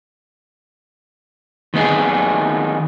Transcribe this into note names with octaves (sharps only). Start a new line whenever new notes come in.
D#3 B3 D#4 G#4